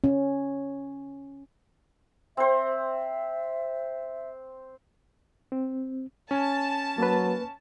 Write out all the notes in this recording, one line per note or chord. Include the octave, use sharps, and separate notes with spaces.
C#4
C4 C5 E5
C4
C#4 G#5 A5
F#3 A#3 B4